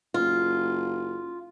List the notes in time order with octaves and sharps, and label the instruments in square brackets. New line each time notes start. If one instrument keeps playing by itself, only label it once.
[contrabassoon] F#1 [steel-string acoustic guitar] F4